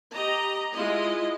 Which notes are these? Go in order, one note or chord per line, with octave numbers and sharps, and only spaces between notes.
G4 D#5 A#5
G#3 E4 F4 D#5